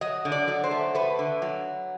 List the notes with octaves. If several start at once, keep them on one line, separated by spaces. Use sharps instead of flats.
F#3 D#5
D3
D5
F#3
C5
A3
A3 B4
D3
F#3